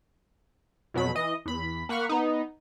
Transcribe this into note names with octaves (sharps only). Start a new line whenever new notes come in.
F2 B2 F#3 B5
E3 D#5
E2 B5
A#3 F#5 B5 C#6 F6
B3 D#4